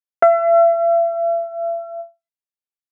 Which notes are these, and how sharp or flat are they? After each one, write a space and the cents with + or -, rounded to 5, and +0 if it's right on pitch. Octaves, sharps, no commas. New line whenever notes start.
E5 +40